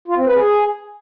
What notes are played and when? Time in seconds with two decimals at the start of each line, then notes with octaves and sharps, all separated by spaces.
0.08 F4
0.17 C4
0.26 B4
0.35 G#4